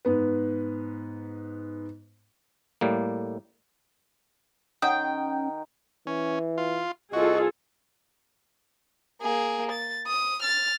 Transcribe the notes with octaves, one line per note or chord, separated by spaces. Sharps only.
G#2 B3 B4
A2 G3 A#3
D#3 C#4 F#5 G5 D#6
E3 C#4
F4
C2 F4 F#4 G#4 A4 D#5
A#3 G#4
A6
D#6
F6 A6